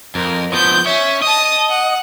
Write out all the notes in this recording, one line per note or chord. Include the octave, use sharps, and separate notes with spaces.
F2 A#4
F3 B3 G6
C#4 C#5 E5
D#5 A5 D#6
F#5